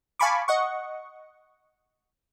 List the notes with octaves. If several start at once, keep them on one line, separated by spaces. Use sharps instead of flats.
F5 G#5 A5 B5 C#6 D6
D#5 F#5 C#6